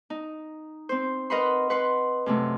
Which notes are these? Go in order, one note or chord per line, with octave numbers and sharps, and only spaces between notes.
D#4
C4 C5
A#4 B4 D#5 F#5 B5 C6
B4 F#5 C6
F#2 C3 A3